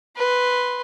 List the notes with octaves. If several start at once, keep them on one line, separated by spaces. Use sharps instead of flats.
B4 C6